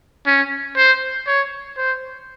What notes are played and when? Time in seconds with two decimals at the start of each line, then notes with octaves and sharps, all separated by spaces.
0.27 C#4
0.77 C5
1.27 C#5
1.77 C5